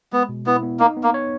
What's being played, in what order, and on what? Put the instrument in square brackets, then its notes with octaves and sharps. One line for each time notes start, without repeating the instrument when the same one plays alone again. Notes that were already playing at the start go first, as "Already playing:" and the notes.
[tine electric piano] G#3 [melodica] B3
[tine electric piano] B2
[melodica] B3 [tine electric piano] E4
[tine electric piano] B3
[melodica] A#3 [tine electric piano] D#4
[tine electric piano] B3
[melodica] A#3
[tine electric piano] C#5